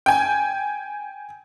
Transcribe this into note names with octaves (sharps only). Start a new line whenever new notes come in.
G5 G#5